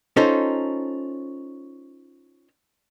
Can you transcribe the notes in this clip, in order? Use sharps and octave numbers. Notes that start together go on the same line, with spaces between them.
C#4 D#4 F4 A4 C5